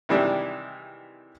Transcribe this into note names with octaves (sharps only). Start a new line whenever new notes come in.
C3 D#3 E3 G3 G#3 D4